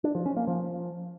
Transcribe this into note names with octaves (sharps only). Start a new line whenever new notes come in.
D4
F3
C#4
A#3
F3